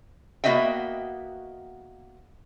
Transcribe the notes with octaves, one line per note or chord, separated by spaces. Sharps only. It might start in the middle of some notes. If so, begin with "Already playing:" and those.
A#3 B3 F#4 D#5 E5 G5